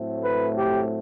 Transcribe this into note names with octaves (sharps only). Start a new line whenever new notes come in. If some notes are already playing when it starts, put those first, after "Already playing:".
Already playing: A2 F#3 A3 C4
B4
G4